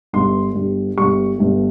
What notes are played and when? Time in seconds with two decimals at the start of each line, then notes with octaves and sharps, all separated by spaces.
0.13 G1 G2 G3 C6
0.55 G1 G2 G3
0.97 G1 G2 G3 C#6
1.39 G1 G2 G3